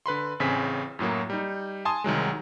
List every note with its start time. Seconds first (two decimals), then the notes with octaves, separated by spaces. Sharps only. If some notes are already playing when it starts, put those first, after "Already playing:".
0.06 D3 B4 B5 C6
0.40 A1 A2 C#3 C4 G#5 B6
0.99 F#2 A2 F#3 A#3
1.30 G3 D#4
1.85 G#5 A5 C6 D#6
2.04 C2 D#3 F#3 G#3